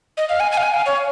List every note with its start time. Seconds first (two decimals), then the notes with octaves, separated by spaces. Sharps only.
0.17 D#5
0.29 F5
0.40 G#5
0.52 G#5
0.58 F5
0.63 G#5
0.74 F5
0.86 C#5